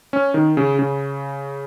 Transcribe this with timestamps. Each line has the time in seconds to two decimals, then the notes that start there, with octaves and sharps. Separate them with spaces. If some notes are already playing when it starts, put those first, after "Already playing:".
0.13 C#4
0.34 D#3
0.57 C#3
0.79 C#3